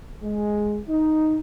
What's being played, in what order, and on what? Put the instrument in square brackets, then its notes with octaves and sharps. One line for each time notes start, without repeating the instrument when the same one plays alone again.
[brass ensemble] G#3
D#4